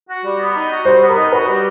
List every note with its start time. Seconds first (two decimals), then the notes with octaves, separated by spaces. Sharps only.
0.09 F#4
0.25 G3
0.39 B3
0.55 D#4
0.70 F#4
0.85 G3 C5
1.01 B3
1.09 A#4
1.17 D#4
1.32 F#4 B4
1.48 G3